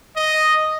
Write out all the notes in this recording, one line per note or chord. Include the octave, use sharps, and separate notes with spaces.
D#5